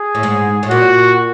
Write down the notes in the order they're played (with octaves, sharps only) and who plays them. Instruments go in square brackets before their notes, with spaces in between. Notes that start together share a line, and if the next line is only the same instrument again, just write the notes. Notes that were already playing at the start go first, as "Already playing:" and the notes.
Already playing: [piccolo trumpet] G#4
[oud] A2
G#2
A2
[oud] A#2 [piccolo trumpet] F#4